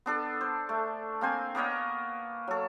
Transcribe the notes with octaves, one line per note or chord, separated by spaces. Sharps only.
B3 D4 A4
C5
A3
A#3 C4 C5 G#5
A#3 B3 C#5 D#5
F#3 A4